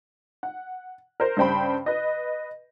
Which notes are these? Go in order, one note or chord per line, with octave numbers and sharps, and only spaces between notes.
F#5
A#4 C5
G2 C#3 C5 G5 B5
B4 D#5